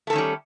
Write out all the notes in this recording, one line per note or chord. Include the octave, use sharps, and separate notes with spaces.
D#3 G3 A3 C#4 A4